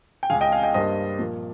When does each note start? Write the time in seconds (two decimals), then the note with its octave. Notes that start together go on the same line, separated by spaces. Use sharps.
0.23 G5
0.30 C#2 C#3 G#3 F5 G#5
0.41 D#5 G5
0.52 F5 G#5
0.63 D#5 G5
0.74 G2 G3 A#3 C5 D#5
1.19 A#2 F3 A#3